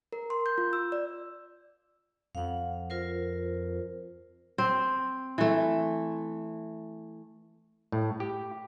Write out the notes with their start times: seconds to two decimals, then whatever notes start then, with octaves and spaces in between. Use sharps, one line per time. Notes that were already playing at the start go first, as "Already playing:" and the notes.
0.13 A#4
0.30 C6
0.46 G6
0.58 F4
0.73 E6
0.92 D5
2.35 F2 F5 F#5
2.90 F4 A#4 C5
4.58 C4
5.38 E3 A3
7.92 A2
8.20 G4